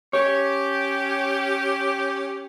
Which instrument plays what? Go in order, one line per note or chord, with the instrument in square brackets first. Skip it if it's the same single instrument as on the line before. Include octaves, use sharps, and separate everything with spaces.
[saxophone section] C#4 G4 [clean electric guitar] C#5